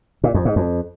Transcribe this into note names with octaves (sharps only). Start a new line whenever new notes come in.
A#2
F2
G#2
F2